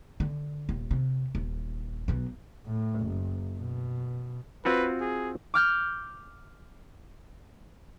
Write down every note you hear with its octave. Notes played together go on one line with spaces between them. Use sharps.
D3
D#1
C3
D#1
B1 B2
A2
F#1
B2
C4 F4 F#4 B4
G#4
D6 F6 G6